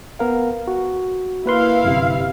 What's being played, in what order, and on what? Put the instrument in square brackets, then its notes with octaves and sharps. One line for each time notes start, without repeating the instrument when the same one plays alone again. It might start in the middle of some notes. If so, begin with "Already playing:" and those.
[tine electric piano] B3 A#4 F5
F#4
[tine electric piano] A#3 B4 C6 [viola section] E4 F5
[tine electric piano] G1 F#2 C3